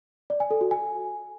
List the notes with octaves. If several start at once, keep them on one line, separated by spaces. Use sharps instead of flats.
D5
G#5
A4
F#4
G#5